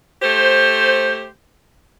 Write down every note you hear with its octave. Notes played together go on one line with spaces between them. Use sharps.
A3 G4 C5